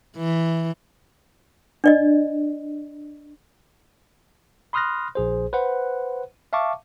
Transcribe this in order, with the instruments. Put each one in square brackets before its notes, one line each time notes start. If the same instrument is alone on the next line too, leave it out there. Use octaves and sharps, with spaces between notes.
[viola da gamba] E3
[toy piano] D4 D5 D#5
[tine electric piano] B5 C6 D#6 F6 F#6 A#6
A#1 G#4 C5
B4 C5 F#5
E5 F5 A5 C#6 D6